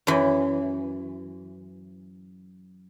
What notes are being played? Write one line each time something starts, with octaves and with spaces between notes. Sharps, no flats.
F#2 E3